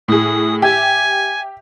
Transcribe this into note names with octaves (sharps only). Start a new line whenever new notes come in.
A2 G#4 D#6
G4 E5 G#5